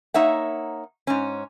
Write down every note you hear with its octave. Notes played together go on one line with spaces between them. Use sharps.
A#3 D#4 C#5 E5 F#5
G#2 C#4